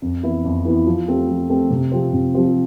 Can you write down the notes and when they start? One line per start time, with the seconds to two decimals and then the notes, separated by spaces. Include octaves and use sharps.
0.02 F2
0.23 E3 B3 E4
0.45 F2
0.65 E3 B3 E4
0.86 F3
1.08 A3 C4 G4
1.28 F3
1.49 A3 C4 G4
1.70 C3
1.91 F3 C4 G4 C5
2.13 C3
2.34 F3 C4 G4 C5